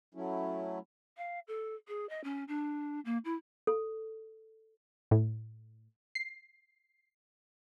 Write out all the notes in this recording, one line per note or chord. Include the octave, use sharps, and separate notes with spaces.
F#3 A3 C#4 E4
F5
A4
G#4
D#5
C#4
D4
A#3
E4
A4
A2
C7